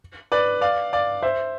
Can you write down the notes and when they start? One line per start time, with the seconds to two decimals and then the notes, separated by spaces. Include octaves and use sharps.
0.32 B4 D5
0.61 D5 F5
0.93 D5 F5
1.22 C5 E5